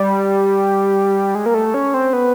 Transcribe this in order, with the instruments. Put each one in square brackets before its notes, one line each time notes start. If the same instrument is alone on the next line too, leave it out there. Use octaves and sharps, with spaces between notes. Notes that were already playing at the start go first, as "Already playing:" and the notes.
Already playing: [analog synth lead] G3
G#3
A#3
A3
C#4
C4
B3